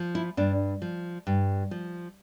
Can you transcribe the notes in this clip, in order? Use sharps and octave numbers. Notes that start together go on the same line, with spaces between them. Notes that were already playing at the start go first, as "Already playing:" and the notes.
Already playing: F3
E4
G2 D4
F3
G2
F3